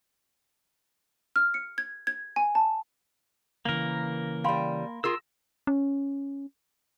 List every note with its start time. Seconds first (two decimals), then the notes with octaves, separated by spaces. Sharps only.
1.36 F6
1.54 C#7
1.78 G#6
2.07 G#6
2.36 G#5
2.55 A5
3.65 C#3 E3 A#3 A#4
4.44 G3 F5 G5 B5 C6
5.04 F4 G#4 A#4 E6
5.67 C#4